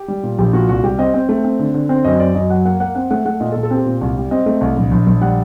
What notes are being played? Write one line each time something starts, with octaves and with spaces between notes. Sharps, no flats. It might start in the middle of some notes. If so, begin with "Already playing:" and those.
Already playing: G4
G3
A#2
A#1 G4
A#2 F#4
C2 F#4
G3 G4
C4 D#5
C4 G5
A3
C4
D3
D3
C4
F#2 D#5
F#2 D5
F#2 D#5
F#3 F#5
A#3 F#5
A#3 F#5
C4 F#5
A3 F#5
A3 F#5
A#2 D#5
A4
A#2
A4
C4 G4
A#2
C2
G3
C4 D#5
A3
C2
A#1
A#1
A#1
G3 F#5